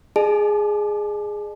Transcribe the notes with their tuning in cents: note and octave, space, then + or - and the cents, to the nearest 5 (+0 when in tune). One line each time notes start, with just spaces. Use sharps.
G#4 +0 D#5 -45 A5 -35